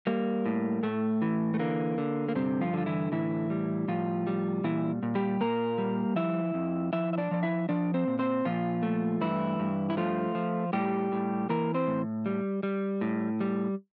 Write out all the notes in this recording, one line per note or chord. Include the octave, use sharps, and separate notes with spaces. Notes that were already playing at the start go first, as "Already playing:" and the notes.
G3 A#3
A2
A2 A3
E3
A3
D3 A#3
D3
A#3
G2 C3 C4
F3 F4
D3 F4
E3 E4
A2 E3 E4
G3
A2 F3 F4
G3
A#2 E3 E4
A#2
G3 G4
A#2 A#3 A#4
G3
F3 E4 E5
F2
F3 E4 E5
E5
D4 D5
F3 D5
E4 E5
F3 D4 D5
C4 C5
A#2
C4 C5
A#2 F3 F4
A3
G2 E3 E4
G2
E4
F3 A3 F4
F3
A2 G3 G4
A2
E3 A#3 A#4
C4 C5
A2
G3
G3
A2
G3